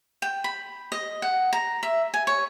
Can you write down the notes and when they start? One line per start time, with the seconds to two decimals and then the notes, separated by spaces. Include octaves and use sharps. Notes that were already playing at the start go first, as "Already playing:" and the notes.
0.22 G5
0.44 B5
0.92 D#5
1.22 F#5
1.53 A#5
1.83 E5
2.14 G#5
2.27 C#5